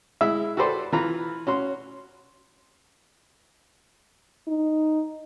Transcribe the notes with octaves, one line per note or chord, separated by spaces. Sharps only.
G#3 E4 E5
F#4 G4 A4 B4 C5 D5
E3 F4 B4 A#5
C#4 F#4 C6
D#4